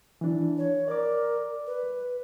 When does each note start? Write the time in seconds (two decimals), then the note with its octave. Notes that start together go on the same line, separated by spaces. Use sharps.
0.21 E3 D4
0.58 C#5
0.88 A#4 D5 D6
1.66 B4